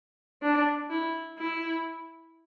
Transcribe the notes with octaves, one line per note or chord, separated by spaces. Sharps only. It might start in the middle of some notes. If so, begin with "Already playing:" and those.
D4
E4
E4